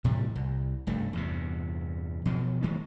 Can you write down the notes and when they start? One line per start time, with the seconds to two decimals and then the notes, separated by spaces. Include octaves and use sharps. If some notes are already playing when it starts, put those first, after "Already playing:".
0.04 A2 C3 E3 G3
0.36 C2
0.87 F1 G2 A3
1.13 E2 G2 C3
2.25 B2 F3 F#3
2.62 D#3 G#3 A#3